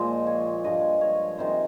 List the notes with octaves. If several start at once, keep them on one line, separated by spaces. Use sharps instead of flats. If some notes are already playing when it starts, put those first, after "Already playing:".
Already playing: A#2 F3 G#3 C5 D#5
C#5
G2 F3 G#3 D#5
C#5
C3 D#3 G#3 C5